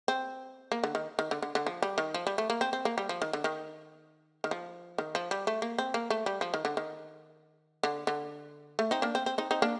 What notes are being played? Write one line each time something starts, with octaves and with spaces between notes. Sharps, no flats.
C4
A#3
D3
D#3
D#3
D3
D3
D3
F3
G3
D#3
F3
G3
A3
A#3
C4
C4
A#3
G3
F3
D#3
D3
D#3
D#3
F3
D#3
F3
G3
A3
A#3
C4
A#3
A3
G3
F3
D#3
D3
D#3
D3
D3
A3
C4 D#4
A#3 D4
C4
C4
C4 D#4
C4 D#4
A#3 D4